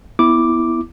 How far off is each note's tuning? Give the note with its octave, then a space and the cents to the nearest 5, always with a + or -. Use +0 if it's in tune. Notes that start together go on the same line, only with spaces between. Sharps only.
B3 +0 E4 +0 D6 +0